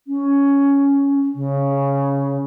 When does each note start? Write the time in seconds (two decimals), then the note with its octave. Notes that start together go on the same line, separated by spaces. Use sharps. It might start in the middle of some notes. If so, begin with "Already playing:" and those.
0.07 C#4
1.35 C#3